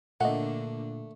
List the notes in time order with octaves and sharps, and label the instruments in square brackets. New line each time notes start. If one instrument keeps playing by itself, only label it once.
[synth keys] A#2 [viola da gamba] D3 A#3 D4 [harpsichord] A3 [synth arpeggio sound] D#5 F#5